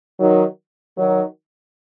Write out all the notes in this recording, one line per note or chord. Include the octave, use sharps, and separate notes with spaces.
D#3 F#3
D#3 F#3